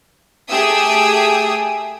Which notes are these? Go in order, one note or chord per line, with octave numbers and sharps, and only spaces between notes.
A3 G4 G#4 D#6 E6 D7